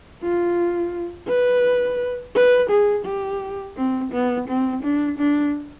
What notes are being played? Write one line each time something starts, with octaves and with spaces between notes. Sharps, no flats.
F4
B4
B4
G#4
G4
C4
B3
C4
D4
D4